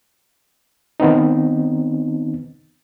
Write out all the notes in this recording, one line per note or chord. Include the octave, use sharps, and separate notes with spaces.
D#3 B3 C4 D#4